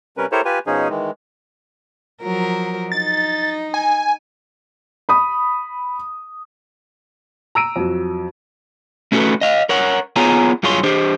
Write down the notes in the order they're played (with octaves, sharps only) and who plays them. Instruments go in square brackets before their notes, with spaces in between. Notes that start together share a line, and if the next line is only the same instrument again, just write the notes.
[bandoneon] C3 G3 C#4 A#4 B4
E4 G4 A4 A#4 C5 C#5
F4 G4 B4 G#5
B2 F3 C#4 D#4 G#4
D#3 E3 G#3
[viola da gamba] F3 F#3 A#4
[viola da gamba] D#4 [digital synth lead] A6
[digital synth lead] G#5
[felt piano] B5 D#6
[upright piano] A#5 E6 D7 D#7
F2 F#3
[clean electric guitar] A3 C#4 F#4 G4 A4 B4
D#5 F5
A#4 C#5 F#5
B3 F4 G#4 C#5 G#5 A#5
G2 F#3 F4 G#4 C#5 C6
D4 G4 C5